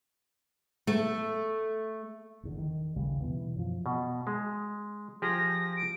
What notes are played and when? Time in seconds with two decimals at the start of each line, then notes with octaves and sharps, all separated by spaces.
0.87 A3
2.43 F#1 E2 D3
2.58 D#3
2.95 A1 D#2 C#3 G3
3.21 B2 E3 B3
3.56 F#2 F3
3.86 B2
4.27 G#3
5.22 F3 G4 G#4 A#6
5.77 D7